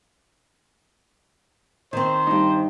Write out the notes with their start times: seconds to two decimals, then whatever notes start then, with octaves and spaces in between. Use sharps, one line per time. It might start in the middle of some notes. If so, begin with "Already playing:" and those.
1.93 D#3 C4 C5
2.27 G2 D#4